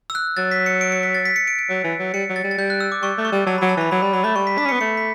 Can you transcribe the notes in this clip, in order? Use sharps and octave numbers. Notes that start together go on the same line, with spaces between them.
E6
F#6
F#3 A6
B6
C#7
D7
C#7
B6
A6
B6
C#7
D7
D7
F#3
E3
F#3
G3 C#7
F#3
A6
G3
A6
G3 G6
F#6
E6
D6
G3 C#6
A3
C#6
G3
F#3 A5
B5
F#3
A5
E3 B5
F#3 B5
G3 B5
F#3 B5
A3 B5
G3 C#6
B6
D4 B6
C#4
C#7
B3
A3 C#7
B6